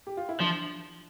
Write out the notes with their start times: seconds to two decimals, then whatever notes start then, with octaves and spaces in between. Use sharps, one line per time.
0.07 G4
0.17 F4
0.29 E4
0.41 F3 D4